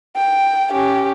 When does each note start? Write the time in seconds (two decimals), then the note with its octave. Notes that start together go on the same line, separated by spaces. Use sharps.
0.16 G5
0.71 C#4 G4